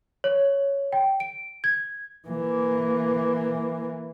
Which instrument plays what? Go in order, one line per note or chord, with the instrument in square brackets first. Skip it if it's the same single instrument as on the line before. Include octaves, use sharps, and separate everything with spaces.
[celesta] C#5
G5
D7
G#6
[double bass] E3 A#3